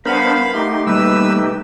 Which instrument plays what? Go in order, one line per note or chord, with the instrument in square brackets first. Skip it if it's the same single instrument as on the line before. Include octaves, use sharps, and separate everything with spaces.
[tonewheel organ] B3 D4 C5 [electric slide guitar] A#4 F#5 [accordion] F5 B5
[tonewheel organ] A3 D#4 G4 [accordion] C6
[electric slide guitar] B2 G3 A#3 [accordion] B4 E6